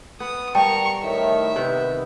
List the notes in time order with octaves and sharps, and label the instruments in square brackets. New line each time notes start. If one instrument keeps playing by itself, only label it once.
[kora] B3 [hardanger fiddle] D#6
[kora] G3 [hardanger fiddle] A#4 C#6 [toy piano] G5 A5
[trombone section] A2 D#3 [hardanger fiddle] E5
[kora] C3 D#3 [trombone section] B3